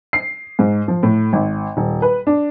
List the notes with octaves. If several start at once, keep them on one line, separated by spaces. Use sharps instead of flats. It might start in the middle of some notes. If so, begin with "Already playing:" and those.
C7
G#2
F3
A2
G#1
D#1
B4
D4